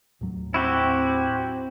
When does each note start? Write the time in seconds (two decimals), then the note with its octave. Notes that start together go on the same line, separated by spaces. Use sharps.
0.21 D#2 A2 F#3
0.54 C4 E4 F#4 G4